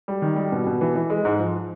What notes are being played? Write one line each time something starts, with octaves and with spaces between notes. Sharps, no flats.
G3
D#3
G3
B2
B2
E3
E3
G#3
G#2
F3